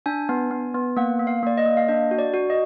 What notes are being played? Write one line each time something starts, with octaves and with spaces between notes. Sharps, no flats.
D4 G#5
B3
B3
B3
A#3 F#5
A#3
F5
A#3 D5
D#5
A#3
F5
D4 D#5
F#4
D5
F#4
D#5